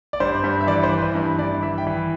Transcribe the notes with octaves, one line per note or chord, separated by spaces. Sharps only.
D5
G2 C5
G2
E5
E3 D5
C5
E3
B4
G2
G2 D5
E3 E5
G5
E3